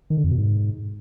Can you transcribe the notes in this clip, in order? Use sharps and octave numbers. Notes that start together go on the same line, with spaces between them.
D#3
D3
F2
B2
G#2